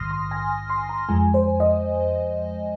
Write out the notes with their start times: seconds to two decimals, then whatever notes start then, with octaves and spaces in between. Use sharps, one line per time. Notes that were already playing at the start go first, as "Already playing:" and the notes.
Already playing: A#1 G#2 D#3 C6 D#6 F6 A#6
0.11 C6
0.31 G#5
0.70 C6
0.89 A#5
1.09 F2 F3 G#3 G#5
1.34 C5
1.60 D#5